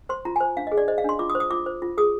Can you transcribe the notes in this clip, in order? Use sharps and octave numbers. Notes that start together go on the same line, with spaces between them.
C5 C6
F4 A#5
G#5
C5
D4 F5
D#5
G#4
D5
C5 D#5
F5
D4 C6
F4 D6
D#6
C5
D#6
F4 D6
C5
F4
G#4 D#6